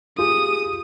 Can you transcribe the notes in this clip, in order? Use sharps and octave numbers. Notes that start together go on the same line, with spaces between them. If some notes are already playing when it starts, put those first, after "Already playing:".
F4 G4 G#4 D#6